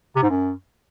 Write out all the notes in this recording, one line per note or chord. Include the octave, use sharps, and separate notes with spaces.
C3
G#2
F#2